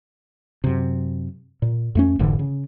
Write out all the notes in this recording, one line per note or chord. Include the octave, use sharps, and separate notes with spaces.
F#2 C3
A#2
F2 A3 C#4
F1 G#2 D3 E3
C#3